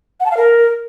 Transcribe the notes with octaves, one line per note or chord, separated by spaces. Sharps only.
F#5
A5
F5
A#4